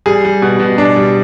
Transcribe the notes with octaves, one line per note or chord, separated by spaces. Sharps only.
G3 G#4
G3
B2
B2
B2 D4
G3